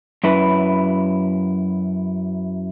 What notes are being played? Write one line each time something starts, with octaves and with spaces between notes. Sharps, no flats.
F#2 E4 B4